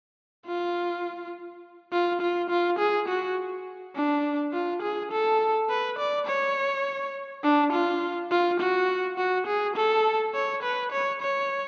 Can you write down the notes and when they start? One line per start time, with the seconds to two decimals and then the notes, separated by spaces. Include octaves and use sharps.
0.46 F4
1.92 F4
2.21 F4
2.50 F4
2.79 G#4
3.08 F#4
3.96 D4
4.53 F4
4.82 G#4
5.12 A4
5.70 B4
5.98 D5
6.27 C#5
7.44 D4
7.73 F4
8.31 F4
8.60 F#4
9.18 F#4
9.47 G#4
9.76 A4
10.34 C#5
10.63 B4
10.92 C#5
11.21 C#5